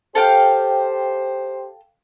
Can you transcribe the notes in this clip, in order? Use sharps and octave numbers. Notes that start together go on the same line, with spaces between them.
G4 A4 C5 F5 G5